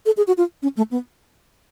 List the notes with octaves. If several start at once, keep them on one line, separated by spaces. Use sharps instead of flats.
A4
G#4
F#4
F4
C#4
A3
B3